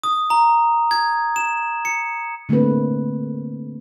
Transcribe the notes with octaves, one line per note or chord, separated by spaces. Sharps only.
D#6
A#5
G#6
E7
C#7
D3 A3 A#3 C4 B4